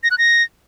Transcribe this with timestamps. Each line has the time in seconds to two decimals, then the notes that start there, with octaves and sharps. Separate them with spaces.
0.03 A#6
0.11 F#6
0.18 A#6